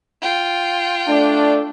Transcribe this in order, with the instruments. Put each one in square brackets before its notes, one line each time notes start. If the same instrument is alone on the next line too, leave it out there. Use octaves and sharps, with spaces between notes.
[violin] F4 G5
[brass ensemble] A3 D4